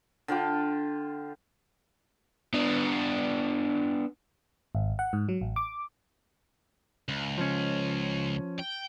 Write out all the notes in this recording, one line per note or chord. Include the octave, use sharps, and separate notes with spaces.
D3 F4 G5 D6
B3 D4
G#1
F#5
G#2
F#3
A1
D6
C#2
F3 C#4
G5